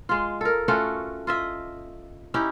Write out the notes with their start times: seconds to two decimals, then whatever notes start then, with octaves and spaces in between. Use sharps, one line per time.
0.09 G#3 F4
0.41 A4 A#4
0.68 A3 C#4 F4 F#4
1.27 F4 D#5 E5
2.34 C#4 D#4 E4 G4